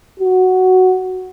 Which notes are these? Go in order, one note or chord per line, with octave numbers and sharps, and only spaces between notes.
F#4